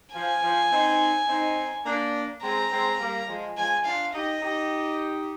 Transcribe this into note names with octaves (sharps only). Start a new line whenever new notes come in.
F3 G#5
F3
C4 D#4
C4 D#4
A#3 D4
G#3 C4 A#5
G#3 C4
G3 A#3
F3 G#3
F3 G#3 G#5
D4 F4 F5
D#4 G4 D#5
D#4 G4